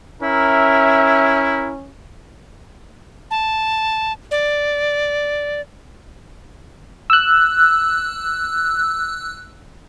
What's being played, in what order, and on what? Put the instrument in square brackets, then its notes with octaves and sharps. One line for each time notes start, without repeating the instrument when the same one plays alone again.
[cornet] C#4 [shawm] E4 [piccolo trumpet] A#4 [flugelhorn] E5
[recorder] A5
D5
[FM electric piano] E6 F#6